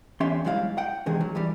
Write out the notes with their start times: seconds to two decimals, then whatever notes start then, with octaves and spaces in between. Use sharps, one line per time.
0.20 E2 C#4 G4 E5 C6
0.45 G#2 F#3 G3 E4 F5
0.78 F#5 G5
1.06 C3 D#3 E3 G#3 G#4
1.21 F#3
1.35 G2 E3 G3